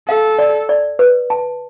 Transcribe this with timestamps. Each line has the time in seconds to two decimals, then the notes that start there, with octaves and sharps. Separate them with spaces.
0.08 A4 F5
0.39 D5
0.69 D5
0.99 B4
1.30 A5